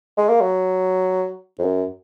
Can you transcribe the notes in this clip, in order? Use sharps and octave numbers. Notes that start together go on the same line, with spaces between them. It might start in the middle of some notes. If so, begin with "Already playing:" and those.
G#3
A#3
F#3
F2
F#2